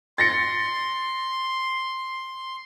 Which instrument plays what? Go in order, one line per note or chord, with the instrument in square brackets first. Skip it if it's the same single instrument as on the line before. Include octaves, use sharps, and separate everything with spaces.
[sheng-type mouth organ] C6 [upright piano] A6 A#6 C#7